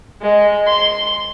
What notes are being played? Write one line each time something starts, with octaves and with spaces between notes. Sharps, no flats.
G#3
C6